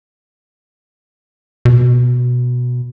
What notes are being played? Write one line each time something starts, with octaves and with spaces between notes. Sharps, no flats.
B2